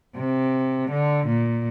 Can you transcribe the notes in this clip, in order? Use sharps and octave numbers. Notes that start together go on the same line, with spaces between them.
C3
D3
A#2